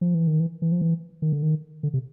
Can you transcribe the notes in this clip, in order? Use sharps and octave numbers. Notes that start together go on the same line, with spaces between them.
F3
E3
D#3
E3
E3
F3
E3
D#3
D3
D#3
D3
C3